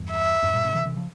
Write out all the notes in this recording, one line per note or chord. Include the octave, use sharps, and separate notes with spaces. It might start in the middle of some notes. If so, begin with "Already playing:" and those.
Already playing: E2 G2
E5
F2 G#2
G2 A#2
G#2 C3
C3 E3
C3 E3
C#3 F3